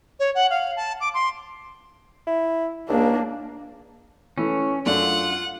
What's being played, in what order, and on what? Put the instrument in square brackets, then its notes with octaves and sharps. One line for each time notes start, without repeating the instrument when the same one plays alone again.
[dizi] C#5
F#5
F5
A5
D6
C6
[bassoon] E4
[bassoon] C#2 [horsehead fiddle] A#3 D4
[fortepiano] E3 A3 [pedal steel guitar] C#4
[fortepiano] F#2 A3 D4 [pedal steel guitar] F4 [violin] F#5